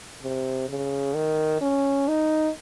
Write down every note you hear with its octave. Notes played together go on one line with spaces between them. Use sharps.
C3
C#3
D#3
C#4
D#4